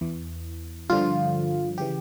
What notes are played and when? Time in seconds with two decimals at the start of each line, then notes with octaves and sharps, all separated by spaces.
0.01 E2 E3
0.90 G2 D3 F3 F4
1.78 C#3 E3 G4